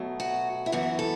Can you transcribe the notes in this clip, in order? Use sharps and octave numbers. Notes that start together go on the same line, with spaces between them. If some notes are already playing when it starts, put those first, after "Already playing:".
Already playing: B2 F#3 A3
F#4
E4
F#2 E3 B3 F#4
A4